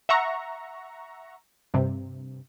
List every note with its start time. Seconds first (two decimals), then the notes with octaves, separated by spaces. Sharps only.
0.09 E5 F#5 A#5 C#6
1.74 G2 C3